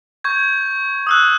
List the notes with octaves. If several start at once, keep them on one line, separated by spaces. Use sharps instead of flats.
C#6 G6 G#6
D#6 E6 F#6